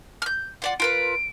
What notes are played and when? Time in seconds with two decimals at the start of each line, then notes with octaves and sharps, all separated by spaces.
0.22 F6 G6
0.62 F4 D5 F#5
0.80 F4 A#4 B4 D7